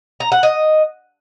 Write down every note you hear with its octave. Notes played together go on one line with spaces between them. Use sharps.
A#5
F#5
D#5